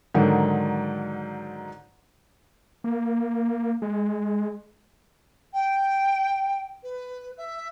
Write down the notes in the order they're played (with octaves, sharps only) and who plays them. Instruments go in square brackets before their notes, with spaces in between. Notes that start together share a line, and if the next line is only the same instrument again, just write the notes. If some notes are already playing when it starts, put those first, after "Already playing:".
[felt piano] G#2 D3 D#3 F#3
[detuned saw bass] A#3
G#3
[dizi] G5
B4
E5